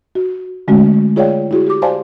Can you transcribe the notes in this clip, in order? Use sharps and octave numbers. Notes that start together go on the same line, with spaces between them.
F#4
D3 G#3 A3 C#4 F#4
F4 G#4 C#5 D5 F5 G5
E4 F#4 G#4
G4 D6
C5 D5 F5 G#5 A5 C6